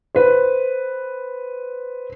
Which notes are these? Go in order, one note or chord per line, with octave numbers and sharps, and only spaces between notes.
B4 C5